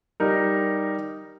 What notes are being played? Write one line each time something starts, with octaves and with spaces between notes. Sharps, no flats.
G3 D#4 A#4